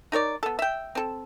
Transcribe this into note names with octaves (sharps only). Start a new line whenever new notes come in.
D#4 A#4 C#5 D5
B3 A4
E5 G5
C4 A4